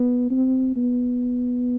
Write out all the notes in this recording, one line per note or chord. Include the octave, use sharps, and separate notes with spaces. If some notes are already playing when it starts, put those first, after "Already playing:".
Already playing: B3
C4
B3